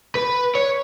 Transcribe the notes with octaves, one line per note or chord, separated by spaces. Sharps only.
B4
C#5